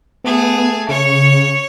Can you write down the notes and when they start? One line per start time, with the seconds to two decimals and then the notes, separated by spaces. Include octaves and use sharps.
0.24 A3 B3 G#4
0.89 C#3 C#5 C#6